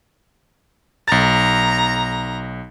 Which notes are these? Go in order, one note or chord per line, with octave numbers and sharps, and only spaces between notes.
B1 A#5 A6